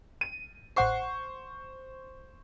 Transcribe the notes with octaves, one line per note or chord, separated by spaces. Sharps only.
D#7
A1 C5 F#5 C#6 C7